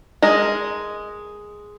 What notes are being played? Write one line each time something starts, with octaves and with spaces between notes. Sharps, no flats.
G#3 A#4 D#5